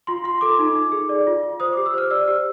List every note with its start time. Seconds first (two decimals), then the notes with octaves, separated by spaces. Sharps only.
0.07 F4 C6
0.24 F4 C6
0.41 A4 D6
0.59 D#4
0.75 D#4
0.92 G#4
1.09 D5
1.27 F4
1.43 F4
1.60 C5 D#6
1.73 D6
1.77 G4
1.86 E6
1.94 C5 F6
2.11 D5 E6
2.28 G4